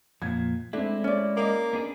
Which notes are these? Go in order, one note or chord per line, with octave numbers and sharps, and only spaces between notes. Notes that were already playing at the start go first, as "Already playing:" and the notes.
F2 A#2 F3 G#6
G#3 A3 C4 D4 E4
C#4 D5
A#3 D#5 D6
B3 D4 G#4